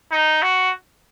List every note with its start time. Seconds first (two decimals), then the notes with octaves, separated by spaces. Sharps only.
0.12 D#4
0.42 F#4